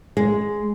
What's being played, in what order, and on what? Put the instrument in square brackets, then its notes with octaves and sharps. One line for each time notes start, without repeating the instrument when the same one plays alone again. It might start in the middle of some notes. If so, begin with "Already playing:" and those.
[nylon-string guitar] G#3